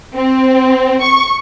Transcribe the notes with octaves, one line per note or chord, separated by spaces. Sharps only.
C4
C#6